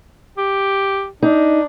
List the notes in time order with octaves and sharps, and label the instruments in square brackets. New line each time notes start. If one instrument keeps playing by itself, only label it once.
[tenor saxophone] G4
[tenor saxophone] D4 [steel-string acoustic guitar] D#4